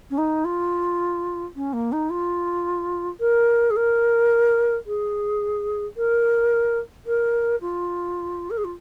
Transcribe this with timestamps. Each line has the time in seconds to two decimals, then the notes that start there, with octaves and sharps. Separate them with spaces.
0.10 C#4
0.18 D#4
0.45 F4
1.56 C#4
1.73 A#3
1.92 D#4
2.10 F4
3.20 A#4
3.71 G#4
3.76 A#4
4.86 G#4
5.97 A#4
7.06 A#4
7.61 F4
8.50 A#4
8.58 G#4
8.64 F4